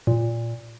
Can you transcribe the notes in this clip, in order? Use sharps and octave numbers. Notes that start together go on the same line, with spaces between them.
A#2